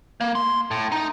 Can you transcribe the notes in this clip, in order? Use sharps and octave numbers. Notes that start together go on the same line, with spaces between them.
A#3
C6
A2
D#4